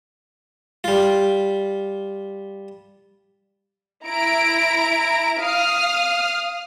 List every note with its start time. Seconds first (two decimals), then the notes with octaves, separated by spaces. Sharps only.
0.84 G3 F4
4.08 E4 A#5 D7
5.41 F5 D#6 F6